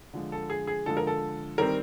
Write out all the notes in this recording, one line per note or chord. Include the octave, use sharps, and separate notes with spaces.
D3 F3 G#3
A4
G#4
G#4
D3 F3 G#3 A4
A#4
A4
D#3 G3 C4 A#4